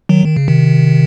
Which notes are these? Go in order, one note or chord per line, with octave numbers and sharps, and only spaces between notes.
D#3 F#3
D#3
C#3
C3 D#3